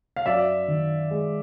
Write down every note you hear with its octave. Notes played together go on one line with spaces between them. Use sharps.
F5
F#2 D5 E5
D#3
G#3